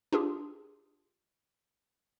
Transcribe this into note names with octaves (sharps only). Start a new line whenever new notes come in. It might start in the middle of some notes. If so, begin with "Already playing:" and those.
D4 F4 G4 G#4